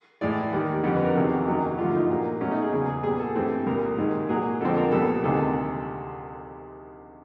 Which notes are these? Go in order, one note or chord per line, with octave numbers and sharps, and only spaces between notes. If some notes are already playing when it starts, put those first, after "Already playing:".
A2 E3 G#3 D5
D#2 D#3 G3
F2 D3 G3
B4
A#4
E2 C3 D#3 F#4
F#2 D#3 F#3 A#3
G2 D3 F3 A3 F4
D#4
A#2 F#3 A#3
B2 F#3 A3 C#4
D#4
G#4
E2 C#3 F#3 G#4
G#4
A#2 G3 B3 G#4
A4
G2 E3 A3 C4 A4
C2 A#2 G3 A#4
G#2 D#3 G#3
A#2 F#3 A#3 G#4
F2 D3 F3 G#3 C4 A4
A#4
C2 A#2 G3 B3 A4
D2 C3 D#3 G#3 A4